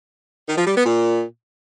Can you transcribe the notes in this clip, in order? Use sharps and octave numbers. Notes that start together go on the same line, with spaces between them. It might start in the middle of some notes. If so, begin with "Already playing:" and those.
D#3
F3
G3
B3
A#2